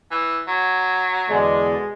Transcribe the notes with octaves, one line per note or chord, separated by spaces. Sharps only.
E3
F#3
E2 B2 D3 G#3 D5